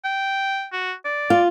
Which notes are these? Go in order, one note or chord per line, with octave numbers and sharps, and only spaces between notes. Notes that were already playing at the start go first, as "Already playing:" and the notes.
G5
F#4
D5
F4